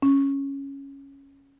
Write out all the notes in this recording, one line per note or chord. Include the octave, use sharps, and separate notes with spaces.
C#4